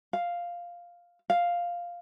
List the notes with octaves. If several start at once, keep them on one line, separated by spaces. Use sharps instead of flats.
F5
F5